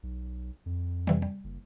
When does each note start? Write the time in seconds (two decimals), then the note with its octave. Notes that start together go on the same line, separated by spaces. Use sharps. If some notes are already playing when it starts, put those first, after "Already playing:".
0.03 B1
0.66 F2
1.07 C3 E3 G3
1.22 G3
1.44 F#1